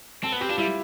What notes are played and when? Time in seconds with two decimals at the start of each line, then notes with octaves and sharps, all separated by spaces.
0.23 C4 A4
0.32 B3 B4
0.41 C4 G4
0.49 D4 F4
0.58 G3 E4